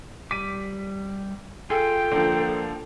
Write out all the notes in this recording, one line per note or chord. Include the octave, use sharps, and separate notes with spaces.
G3 D6 B6 D#7
F4 G#4 A4 G5
D3 F3 A#3 C5